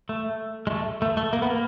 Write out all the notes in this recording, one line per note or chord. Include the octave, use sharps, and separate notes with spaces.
A3
G#3
A3
A3
A3
A#3
B3
A#3